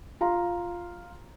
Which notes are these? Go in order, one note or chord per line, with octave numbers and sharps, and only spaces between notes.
F4 F5 A#5 C6